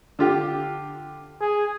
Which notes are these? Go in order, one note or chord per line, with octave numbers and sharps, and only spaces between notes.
D3 F4 G4
G#4